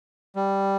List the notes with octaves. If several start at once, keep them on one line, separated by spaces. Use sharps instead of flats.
G3